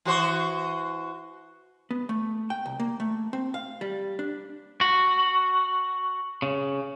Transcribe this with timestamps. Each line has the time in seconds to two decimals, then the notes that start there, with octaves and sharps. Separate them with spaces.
0.05 E3 F#4 C5
1.91 B3
2.09 A3
2.50 G5
2.66 C2
2.80 A#3
3.00 A3
3.33 C4
3.54 F5
3.81 G3
4.19 D4
4.81 F#4
6.42 C#3